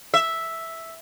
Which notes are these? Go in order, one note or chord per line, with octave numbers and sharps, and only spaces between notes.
E5